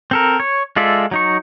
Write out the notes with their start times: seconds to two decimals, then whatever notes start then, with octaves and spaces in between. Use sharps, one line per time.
0.11 C4 A4 A#4
0.40 C#5
0.76 G#3 F4 A4 D5 E5
1.11 F#3 D#4 C#6